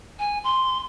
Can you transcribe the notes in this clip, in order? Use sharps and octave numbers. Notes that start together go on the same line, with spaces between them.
G#5
C6